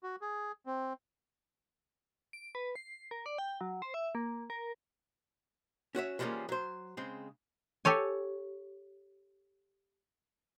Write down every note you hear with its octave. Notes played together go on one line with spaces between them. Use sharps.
F#4
G#4
C4
D7
B4
C7
A#4
D5
G5
F#3
C5
E5
A#3
A#4
C#4 F#4 C#5 E5
E3 F3 G3 G#3 A#3 C#4
F#3 C5
C#3 G#3 C4
G4 A4 C#5 G#5